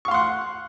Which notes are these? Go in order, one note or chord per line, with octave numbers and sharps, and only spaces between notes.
F5 F#5 C6 C#6